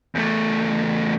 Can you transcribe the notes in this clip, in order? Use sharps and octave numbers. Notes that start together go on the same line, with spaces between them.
E2 A3